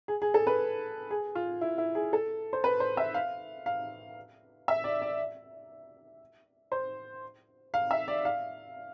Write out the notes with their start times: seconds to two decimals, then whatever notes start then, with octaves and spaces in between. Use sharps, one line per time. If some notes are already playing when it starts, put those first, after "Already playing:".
0.08 G#4
0.22 G#4
0.34 A4
0.47 B4
1.11 G#4
1.35 F4
1.61 E4
1.78 E4
1.95 G#4
2.13 A4
2.53 C5
2.64 B4
2.80 C5
2.97 E5
3.14 F5
3.66 F5
4.68 E5
4.84 D5
5.02 D5
6.72 C5
7.74 F5
7.91 E5
8.08 D5
8.25 F5